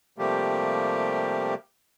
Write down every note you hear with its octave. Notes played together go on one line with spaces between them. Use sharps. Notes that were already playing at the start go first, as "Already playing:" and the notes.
C3 F3 G3 A3 A#3 G4